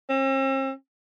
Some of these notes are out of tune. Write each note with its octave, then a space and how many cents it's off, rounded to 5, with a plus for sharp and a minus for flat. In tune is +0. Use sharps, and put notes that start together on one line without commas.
C4 +45